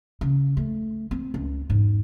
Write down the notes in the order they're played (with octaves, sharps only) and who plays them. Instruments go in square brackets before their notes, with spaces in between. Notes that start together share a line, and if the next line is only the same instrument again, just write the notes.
[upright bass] C#3
A3
C4
C#2
E1 G#2